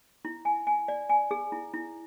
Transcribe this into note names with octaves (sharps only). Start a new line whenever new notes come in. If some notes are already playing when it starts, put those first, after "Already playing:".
E4
G#5
G#5
D5
G#5
G#4
E4
E4